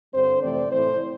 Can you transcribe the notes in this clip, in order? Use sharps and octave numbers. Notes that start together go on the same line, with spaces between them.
G2 D3 G3 C4 C5
F2 C3 E3 A3 C4 D5
A2 E3 A3 C4 C5